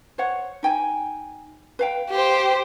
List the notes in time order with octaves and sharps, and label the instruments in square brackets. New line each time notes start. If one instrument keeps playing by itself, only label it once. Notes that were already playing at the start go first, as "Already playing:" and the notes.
[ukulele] C5 C#5 F#5
D#4 G5 G#5
B4 F5 G5
[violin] G4 C5